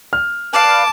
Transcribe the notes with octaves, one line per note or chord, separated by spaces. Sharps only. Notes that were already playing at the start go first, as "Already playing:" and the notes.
F6
B4 D5 F5 A5 D6